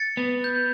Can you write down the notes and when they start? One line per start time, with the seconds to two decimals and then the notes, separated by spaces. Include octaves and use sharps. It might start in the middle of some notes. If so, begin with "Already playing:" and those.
Already playing: A6 C#7
0.17 B3
0.44 G6